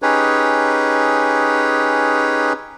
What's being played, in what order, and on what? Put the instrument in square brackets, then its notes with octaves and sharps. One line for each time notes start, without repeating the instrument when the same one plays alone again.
[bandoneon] C#4 D#4 G4 G#4 B4 C#5